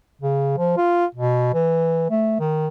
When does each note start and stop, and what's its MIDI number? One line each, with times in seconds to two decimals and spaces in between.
0.21 0.55 49
0.58 0.75 53
0.77 1.05 65
1.15 1.52 47
1.54 2.09 52
2.10 2.35 57
2.39 2.68 51